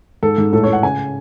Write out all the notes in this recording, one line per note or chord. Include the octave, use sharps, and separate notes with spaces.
G#2 A4
G#2
A2 A4
A2 C#5
F#5
C#3 G#5